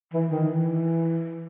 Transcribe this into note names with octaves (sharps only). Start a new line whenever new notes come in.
E3
D#3
E3